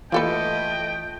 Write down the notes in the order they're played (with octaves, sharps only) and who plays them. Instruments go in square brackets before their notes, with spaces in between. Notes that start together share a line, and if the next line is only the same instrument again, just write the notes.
[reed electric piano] E3 F4 [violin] A3 D#5 [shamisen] A#3 A4 B4 [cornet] G5